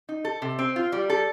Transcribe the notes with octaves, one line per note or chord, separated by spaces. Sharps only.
D#4
A4
C3
C4
F4
G3
A4